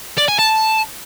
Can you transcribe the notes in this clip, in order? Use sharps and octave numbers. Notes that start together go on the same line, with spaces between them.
D5
G#5
A5